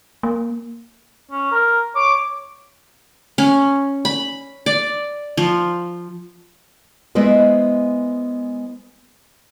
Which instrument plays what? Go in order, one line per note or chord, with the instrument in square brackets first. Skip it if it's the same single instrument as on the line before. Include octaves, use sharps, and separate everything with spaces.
[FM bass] A#3
[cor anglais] C#4
A#4
[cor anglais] C#5 [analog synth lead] D6
[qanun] C#4
B5
D5
F3
[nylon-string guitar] G#3 B3 E4 C5 D#5